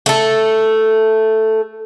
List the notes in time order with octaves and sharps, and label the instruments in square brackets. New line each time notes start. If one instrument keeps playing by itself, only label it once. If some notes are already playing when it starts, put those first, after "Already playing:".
[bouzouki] A3 A4